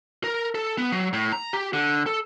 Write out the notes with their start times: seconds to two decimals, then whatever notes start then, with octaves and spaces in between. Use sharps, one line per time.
0.24 A#4
0.55 A4
0.78 B3
0.92 F#3
1.13 A2
1.32 A#5
1.53 G4
1.73 D3
2.06 A4